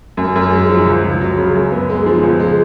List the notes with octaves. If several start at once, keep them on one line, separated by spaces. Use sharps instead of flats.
F#2
F#2
G#3
F3
C#2
C#2
F#3
C#3
F#2
B3
G#3
F3
C#2
G#3